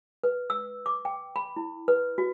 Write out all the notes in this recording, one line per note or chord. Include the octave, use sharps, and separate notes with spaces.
B4
E6
D6
G5
B5
E4
B4
F#4